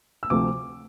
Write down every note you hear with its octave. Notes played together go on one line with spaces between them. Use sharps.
E6
D2 C3 F3 A3 D6